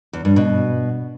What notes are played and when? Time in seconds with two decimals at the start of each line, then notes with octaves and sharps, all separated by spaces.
0.13 E2
0.25 G2
0.36 B2